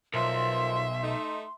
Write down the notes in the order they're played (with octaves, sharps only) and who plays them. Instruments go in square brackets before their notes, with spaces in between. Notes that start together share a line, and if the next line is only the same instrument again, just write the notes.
[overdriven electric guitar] B1 [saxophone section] F3 A#4 [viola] E5 [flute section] C6
[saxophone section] A3 D#4